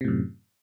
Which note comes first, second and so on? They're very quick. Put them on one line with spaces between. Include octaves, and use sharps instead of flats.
C3 A2 F#2